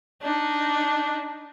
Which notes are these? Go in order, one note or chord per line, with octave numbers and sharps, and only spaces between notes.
D4 D#4